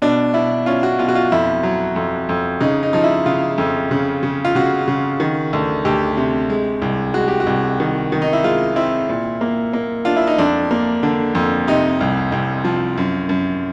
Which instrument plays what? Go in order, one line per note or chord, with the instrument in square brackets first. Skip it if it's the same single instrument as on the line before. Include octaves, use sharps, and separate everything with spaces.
[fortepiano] B2 D4
B2 E4
C#4 F4
F#4
B2 F4
F#4
F4
F2 E4
F#3
F2
F2
C#3 D#4
D#4
F3 D#4
E4
C#3 F4
F2
C#3
C#3
F4
C#3 F#4
C#3
D#3
D2
D2 G4
C3
G#3
C2
G#3 F#4
G4
F#4
C2
D#3
D#3
D#4
E4
G#3 F4
C4 E4
A#2
A#3
A#3
D4 F4
E4
D#4
F2 D4
A#3
D3
F2
C3 D#4
C2
C2
F3
F#2
F#2